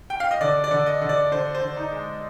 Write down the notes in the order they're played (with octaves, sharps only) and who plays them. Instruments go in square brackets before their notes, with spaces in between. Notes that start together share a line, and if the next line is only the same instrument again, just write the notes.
[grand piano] G5
F5
D#5
D3 D5
D5
D3
D#5
D3
D5
D3 C5
C5
D3
D#4
G#3